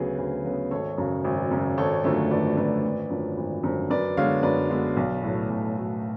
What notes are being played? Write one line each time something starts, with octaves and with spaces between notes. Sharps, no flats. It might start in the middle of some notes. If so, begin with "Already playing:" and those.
Already playing: D2 C#3 F#3 B3 G#4 B4
D2
C#3 F#3 B3
G#1 A4 C#5
F#2 C#3
G#1
F#2 C#3
G#1 A4 C#5
F#2 D3 F3 A3
G#1 B4 D5
F#2 D3 F3 A3 B4 D5
G#1
F#2 D3 F3
G#1
F#2 D3 F3
F#2 B4 D5
D3 G#3 B3 C#5 F5
F#2 B4 D5
D3 G#3 B3
B1
A2 F#3 A3
B1
A2 F#3 A3